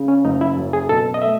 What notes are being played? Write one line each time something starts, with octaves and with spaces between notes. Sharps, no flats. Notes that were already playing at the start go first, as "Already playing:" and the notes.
Already playing: C#3
C#4
F#1 D#4
E4
F#2
G#4
B2 A4
D#5
A3 E5